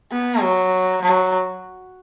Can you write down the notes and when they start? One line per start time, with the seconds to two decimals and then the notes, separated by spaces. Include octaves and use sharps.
0.12 B3
0.42 F#3
1.03 F#3